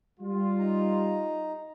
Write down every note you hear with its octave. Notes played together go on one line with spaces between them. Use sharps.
G3 F4
D#4 A#5